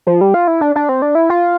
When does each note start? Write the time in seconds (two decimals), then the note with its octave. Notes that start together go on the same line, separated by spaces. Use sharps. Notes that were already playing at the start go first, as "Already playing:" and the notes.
0.07 F3
0.21 G3
0.34 F4
0.48 E4
0.61 D4
0.76 D4
0.89 C4
1.02 D4
1.15 E4
1.30 F4